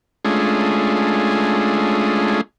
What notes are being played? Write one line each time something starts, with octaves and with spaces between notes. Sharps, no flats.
G#3 A3 C#4 D4 F4 G#4